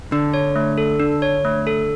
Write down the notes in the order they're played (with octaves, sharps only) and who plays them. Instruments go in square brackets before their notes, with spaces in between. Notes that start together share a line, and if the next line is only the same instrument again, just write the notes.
[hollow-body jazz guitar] D3 [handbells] D4
[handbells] C#5
A3
A4
D4
C#5
A3
A4